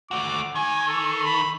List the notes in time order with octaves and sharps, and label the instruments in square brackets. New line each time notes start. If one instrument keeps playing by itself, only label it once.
[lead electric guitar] A3 F#4 [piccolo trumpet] D6
[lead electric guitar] D#3 [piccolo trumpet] G#5
[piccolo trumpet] A4
B5